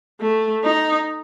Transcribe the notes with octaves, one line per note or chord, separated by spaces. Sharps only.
A3
D#4